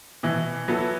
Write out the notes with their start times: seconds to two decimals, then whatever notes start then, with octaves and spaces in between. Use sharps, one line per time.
0.23 B2 E3
0.68 F#3 B3 E4 A4